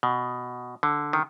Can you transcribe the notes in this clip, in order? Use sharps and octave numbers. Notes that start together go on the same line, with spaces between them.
B2
D3
D#3